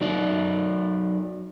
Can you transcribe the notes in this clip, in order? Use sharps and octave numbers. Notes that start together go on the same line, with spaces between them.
F#3 D#4 D5